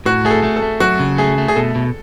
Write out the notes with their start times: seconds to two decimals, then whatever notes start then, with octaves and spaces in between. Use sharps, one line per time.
0.06 A2 F#4
0.25 A3 G#4
0.31 A4
0.43 A3
0.56 A4
0.62 A3
0.80 F#3 F#4
1.00 C#3
1.18 A3 G#4
1.38 A3
1.48 G#4
1.56 B2 A4
1.75 B2